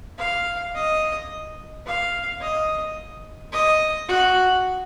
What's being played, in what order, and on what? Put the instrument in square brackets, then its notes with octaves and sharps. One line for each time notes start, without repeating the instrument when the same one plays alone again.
[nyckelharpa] F5
D#5
F5
D#5
D#5
F#4